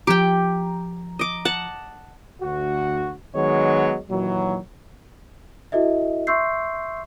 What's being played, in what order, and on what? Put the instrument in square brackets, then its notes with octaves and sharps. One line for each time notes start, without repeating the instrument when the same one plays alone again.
[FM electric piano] F3 A#5 [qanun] G4 G5
[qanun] D#5 D6
F#5 A5
[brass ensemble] D2 F#4
D#3 F#3 G#3 B3 C#5 D#5
A#2 D#3 E3 F#3
[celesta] E4 F#4 A4 D#5 E5
E5 C6 C#6 E6 G6 C7